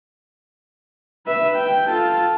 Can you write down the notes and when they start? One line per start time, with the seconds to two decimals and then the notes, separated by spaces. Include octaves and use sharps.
1.26 B4 E5
1.56 G5
1.87 F4 A4